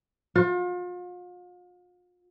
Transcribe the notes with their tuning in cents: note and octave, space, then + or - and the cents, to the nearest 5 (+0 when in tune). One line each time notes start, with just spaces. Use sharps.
F4 +40